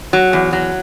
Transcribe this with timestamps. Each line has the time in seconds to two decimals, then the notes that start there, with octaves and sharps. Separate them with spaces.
0.13 F#3
0.33 E2
0.53 F#3